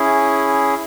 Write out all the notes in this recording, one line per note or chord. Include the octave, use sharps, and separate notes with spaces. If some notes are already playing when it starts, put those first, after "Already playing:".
Already playing: C#4 E4 G#4